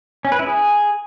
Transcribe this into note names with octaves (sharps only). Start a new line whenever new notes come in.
C#4
B4
E4
G#4